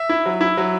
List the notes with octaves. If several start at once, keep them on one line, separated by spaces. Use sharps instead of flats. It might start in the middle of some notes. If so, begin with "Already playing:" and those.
Already playing: E5
E4
F#3
E4
F#3